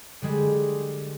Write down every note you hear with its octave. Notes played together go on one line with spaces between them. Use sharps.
D3 G3 G#3